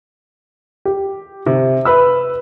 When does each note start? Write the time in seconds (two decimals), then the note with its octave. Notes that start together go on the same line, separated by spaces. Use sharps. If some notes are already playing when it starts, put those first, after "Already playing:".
0.85 G4
1.46 C3
1.85 B4 B5 E6